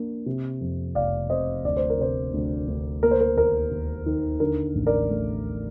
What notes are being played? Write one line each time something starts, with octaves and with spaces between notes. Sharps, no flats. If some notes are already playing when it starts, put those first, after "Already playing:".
Already playing: A#3 D4
C3
F2
F1 D5 F5
C3 C5 D#5
D2 D5
C5
A#4
C3 C5
D2
D2
A#3 A#4
C5
A#4
D#2 A#4
D#2
D#3
D3 A#4
A1
A#4 D5
A3